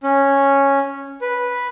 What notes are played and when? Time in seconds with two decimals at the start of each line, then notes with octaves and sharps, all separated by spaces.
0.03 C#4
1.21 B4